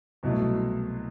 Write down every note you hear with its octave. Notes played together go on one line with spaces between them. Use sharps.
C2 B2 F#3 A3